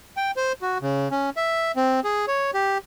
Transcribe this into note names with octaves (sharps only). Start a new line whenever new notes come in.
G5
C5
F#4
C#3
C#4
E5
C4
G#4
C#5
G4